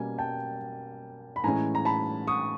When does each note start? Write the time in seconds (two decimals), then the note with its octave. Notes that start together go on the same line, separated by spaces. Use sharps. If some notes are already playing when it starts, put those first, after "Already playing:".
Already playing: B2 G3 A#3 C#4 G#5
0.19 G5 A5
1.36 B5
1.44 A2 E3 G#3 C#4 G#5 A#5
1.75 A#5
1.85 A5 B5
2.27 C#6 D#6